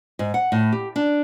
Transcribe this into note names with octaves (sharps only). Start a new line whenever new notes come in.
G#2
F#5
A2
G4
D4